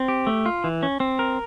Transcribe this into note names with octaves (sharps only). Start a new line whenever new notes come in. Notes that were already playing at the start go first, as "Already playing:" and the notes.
Already playing: C4
G4
A3
F4
E3
C#4
C4
A#4